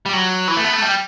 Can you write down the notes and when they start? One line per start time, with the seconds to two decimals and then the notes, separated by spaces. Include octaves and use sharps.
0.06 G3
0.13 F#3
0.48 E3
0.57 A3
0.64 B3
0.73 A3
0.82 G3